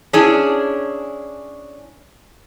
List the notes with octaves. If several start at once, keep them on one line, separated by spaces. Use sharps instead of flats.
C#4 D4 E4 G#4